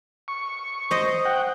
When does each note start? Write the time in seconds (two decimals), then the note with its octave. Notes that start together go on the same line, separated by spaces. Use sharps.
0.28 C#6
0.91 C5 D#5
1.25 F#5 G5